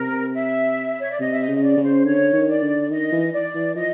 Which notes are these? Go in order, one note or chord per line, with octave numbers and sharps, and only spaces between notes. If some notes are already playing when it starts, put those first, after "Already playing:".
Already playing: C3 A#4
E5
C#5
D5
C3 D#5
E5
D#5
C#3
D#5
D5
C#3
C5
D3 C#5
D#3
D5
D3
D#3 D#5
E3
D5
E3
F3 D#5